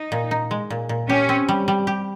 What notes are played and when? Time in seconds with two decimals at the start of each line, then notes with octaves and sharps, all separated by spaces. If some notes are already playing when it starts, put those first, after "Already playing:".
Already playing: D#4
0.12 A#2
0.31 D#4
0.51 G#3
0.70 A#2
0.89 A#2
1.09 C#4 G4
1.29 C4
1.49 G3
1.68 G3
1.87 G4